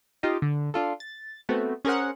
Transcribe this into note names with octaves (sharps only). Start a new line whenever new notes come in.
D#4 F4 G4 D#5
D3
D4 F4 A4
A6
A3 B3 C4 F#4
C#4 G#4 A#4 C5 F#5